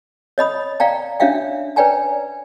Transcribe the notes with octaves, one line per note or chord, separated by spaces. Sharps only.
C#5 D#5 B5 D#6
D5 F5 G5 A#5
C#4 D4 C#5 E5 F5 G5
B4 C#5 D5 G5 G#5 A#5